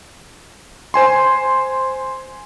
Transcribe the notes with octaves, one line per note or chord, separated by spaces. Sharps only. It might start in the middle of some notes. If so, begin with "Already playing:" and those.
C5 G#5 C6